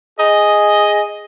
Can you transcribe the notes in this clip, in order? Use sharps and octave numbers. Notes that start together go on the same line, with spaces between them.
G#4 D#5